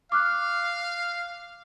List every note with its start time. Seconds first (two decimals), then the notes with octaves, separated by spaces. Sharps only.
0.12 F5 D6 F6 F#6